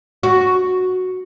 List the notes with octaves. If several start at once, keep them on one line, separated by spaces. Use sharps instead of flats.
F#4